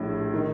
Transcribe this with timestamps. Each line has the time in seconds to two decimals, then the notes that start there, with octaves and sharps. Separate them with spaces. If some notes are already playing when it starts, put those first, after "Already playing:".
Already playing: A#1 A2 G3 D4
0.33 D#3